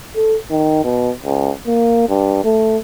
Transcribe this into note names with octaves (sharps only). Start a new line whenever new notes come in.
A4
D#3
B2
C#2
A#3
G2
A3